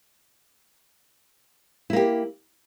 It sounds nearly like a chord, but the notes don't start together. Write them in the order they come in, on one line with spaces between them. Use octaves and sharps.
E4 A#3 G4